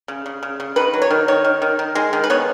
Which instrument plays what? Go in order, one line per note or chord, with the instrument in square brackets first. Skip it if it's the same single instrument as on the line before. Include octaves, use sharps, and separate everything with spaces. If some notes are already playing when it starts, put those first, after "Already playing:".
[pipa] C#3
C#3
C#3
C#3
D#3 B4
F#3
C#5
D#3
D#3 C#5
D#3
D#3
D#3
G#3
D#3
B4
B3 C#5